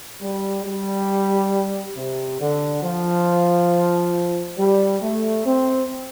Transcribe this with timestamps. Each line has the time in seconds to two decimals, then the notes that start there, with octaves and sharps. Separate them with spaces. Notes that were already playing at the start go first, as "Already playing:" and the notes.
0.21 G3
0.64 G3
1.96 C3
2.39 D3
2.83 F3
4.57 G3
5.01 A3
5.44 C4